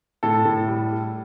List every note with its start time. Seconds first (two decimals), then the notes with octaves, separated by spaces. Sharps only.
0.23 A2 A4
0.45 A2
0.68 G3
0.91 G3